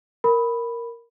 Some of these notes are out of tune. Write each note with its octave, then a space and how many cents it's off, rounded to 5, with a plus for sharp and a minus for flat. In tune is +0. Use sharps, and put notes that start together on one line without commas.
A#4 +0 B5 +0